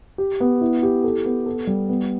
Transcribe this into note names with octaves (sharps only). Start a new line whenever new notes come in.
G4
B3
E4
G4
A4
B3
A4
G3
B3